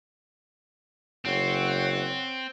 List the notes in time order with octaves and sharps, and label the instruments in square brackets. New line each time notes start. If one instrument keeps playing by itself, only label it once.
[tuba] F#1 [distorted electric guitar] C4 [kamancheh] C#5 F#5